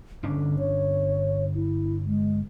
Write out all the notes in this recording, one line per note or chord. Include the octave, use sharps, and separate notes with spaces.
G1 D3 C#4 D4
C#5
E4
G#3